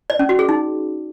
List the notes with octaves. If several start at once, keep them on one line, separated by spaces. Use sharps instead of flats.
D5
C#4
F#4
G#4
D#4